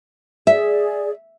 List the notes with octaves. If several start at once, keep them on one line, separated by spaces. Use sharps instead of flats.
G#4 D5 E5